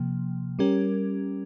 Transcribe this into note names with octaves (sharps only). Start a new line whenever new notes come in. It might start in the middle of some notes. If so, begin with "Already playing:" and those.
Already playing: C3 F3 A#3
G3 C#4 G4 A#4